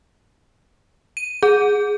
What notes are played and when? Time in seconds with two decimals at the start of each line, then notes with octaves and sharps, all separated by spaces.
1.17 D#7
1.43 G#4